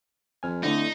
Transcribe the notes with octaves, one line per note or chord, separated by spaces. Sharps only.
F2 G#5 F6
D3 A3 C4 D#4 E4